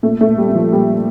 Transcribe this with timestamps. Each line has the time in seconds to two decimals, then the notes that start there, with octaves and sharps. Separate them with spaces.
0.03 A#2 A3
0.21 A3
0.26 A#2
0.38 G3
0.50 A#2
0.55 F3
0.72 A#2 G3